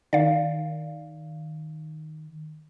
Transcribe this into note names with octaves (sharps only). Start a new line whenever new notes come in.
D#3 D5 F5